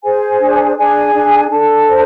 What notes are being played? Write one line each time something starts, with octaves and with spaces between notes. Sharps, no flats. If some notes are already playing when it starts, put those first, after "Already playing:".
G#4 C5 G#5
D4
D4 G#4 G#5
D4
D4 A4 A5
C5